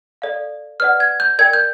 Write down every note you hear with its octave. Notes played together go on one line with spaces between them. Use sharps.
A4 D5 F5
B4 D5 F#5 F6
G#6
G6
A#4 D5 G5 G#6
G6